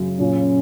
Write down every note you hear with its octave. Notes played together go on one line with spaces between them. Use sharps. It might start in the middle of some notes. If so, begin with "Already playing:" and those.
Already playing: F#2 C#3
A#2 C#4